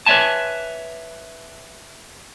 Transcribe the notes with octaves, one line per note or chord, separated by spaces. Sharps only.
B4 C#5 D5 E5 G#5 A5